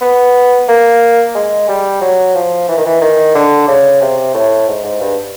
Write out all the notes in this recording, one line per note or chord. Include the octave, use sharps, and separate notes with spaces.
B3
A#3
G#3
G3
F#3
F3
E3
D#3
E3
D#3
D3
C#3
C3
A2
G#2
G#2
G2